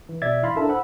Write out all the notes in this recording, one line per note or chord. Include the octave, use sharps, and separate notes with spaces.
E3
A1 B2 D5 E5 G#6 A6
E3 E4 F5 B5 C6 B6
D4 E4 A4 A#4 E5 A5
C5 F#5 B5 E6